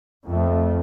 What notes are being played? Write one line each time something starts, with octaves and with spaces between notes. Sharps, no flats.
F2 A3